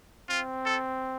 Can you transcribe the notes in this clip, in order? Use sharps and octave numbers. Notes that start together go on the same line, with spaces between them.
C4 F4
A4